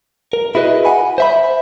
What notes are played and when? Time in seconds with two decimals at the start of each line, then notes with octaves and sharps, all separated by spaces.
0.33 A#4
0.55 E4 F#4 G#4 B4 D#5
0.85 F#5 G#5 B5
1.18 C5 E5 B5